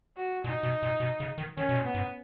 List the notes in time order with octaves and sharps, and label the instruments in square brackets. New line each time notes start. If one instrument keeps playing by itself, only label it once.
[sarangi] F#4
[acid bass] A#2 [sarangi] D#4
[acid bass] B2
A#2
B2
C#3
D#3
[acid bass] D#3 [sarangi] C#4
[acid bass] B2
A#2
[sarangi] B3
[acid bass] G#2